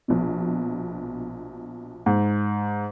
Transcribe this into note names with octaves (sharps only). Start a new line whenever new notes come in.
A#1 B2
G#2